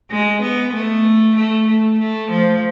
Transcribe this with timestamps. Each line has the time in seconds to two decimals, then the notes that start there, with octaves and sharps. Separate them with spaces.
0.11 G#3
0.42 B3
0.74 A3
1.36 A3
1.67 A3
2.00 A3
2.31 F3